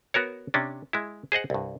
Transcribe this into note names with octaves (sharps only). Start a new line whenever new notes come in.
B3 F#4 A#4 C#5
C3 C#4 D4
G#3 E4
G#4 C5 D#5 F#5
C2 G2